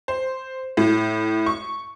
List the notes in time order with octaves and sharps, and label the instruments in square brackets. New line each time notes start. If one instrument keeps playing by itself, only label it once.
[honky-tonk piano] C5
A2
C#6